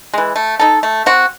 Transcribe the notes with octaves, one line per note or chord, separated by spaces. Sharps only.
E3 G#3
A3
D#4 A4
A3
C4 F#4